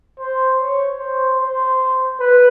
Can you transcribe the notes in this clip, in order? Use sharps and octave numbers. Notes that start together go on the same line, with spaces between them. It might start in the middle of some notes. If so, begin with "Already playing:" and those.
C5
C#5
C5
C5
B4